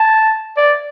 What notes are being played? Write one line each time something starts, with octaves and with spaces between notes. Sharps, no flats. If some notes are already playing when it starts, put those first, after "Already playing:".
Already playing: A5
D5